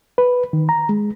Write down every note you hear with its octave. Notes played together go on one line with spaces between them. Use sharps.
B4
D#3
A#5
G#3